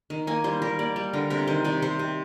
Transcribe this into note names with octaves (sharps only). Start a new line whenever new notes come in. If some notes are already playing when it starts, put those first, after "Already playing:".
D#3
A#3 G#5
G3 C5
G3 A#4
A#3 D5
G3
D3 A#4
C3 A#4
D#3 C5
C3 D5
C3 C5
C3